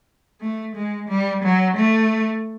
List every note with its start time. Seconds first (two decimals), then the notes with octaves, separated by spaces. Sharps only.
0.41 A3
0.75 G#3
1.08 G3
1.43 F#3
1.76 A3